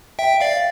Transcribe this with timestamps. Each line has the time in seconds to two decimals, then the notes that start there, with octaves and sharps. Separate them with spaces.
0.19 E5 G5
0.41 D5 F5